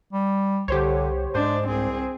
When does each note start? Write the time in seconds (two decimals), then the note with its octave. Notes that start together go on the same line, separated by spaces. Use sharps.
0.13 G3
0.68 C2 D3 G4 C5 C#5
1.35 G#2 G#3 D4 C5
1.68 C2 C4 G#4